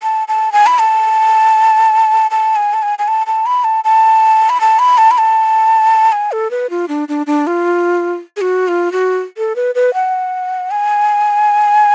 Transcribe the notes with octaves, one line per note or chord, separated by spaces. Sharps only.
A5
A5
G#5
B5
A5
A5
G#5
A5
G#5
G#5
A5
A5
B5
A5
A5
B5
A5
B5
A5
B5
A5
G#5
A4
B4
F4
D4
D4
D4
F4
G#4
F#4
F4
F#4
A4
B4
B4
F#5
G#5